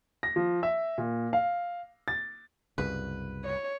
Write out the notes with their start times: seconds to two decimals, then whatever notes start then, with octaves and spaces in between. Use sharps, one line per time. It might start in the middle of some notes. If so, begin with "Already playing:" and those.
0.23 A#6
0.36 F3
0.63 E5
0.98 A#2
1.33 F5
2.08 A6
2.78 C2 F#2 C#3 B4
3.45 C#5